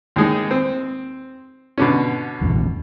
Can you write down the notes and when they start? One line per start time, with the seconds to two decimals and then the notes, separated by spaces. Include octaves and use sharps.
0.16 D#2 G#3 D#4
0.51 C4
1.78 B2 D3 C#4
2.41 D#1 A#1 E2